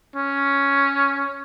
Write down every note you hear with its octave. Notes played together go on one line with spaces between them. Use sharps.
C#4